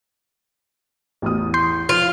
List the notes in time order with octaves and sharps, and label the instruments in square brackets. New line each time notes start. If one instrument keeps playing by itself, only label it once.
[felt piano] A1 E2 D#6
[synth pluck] C6 G6 C7
[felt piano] F3 [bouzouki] F4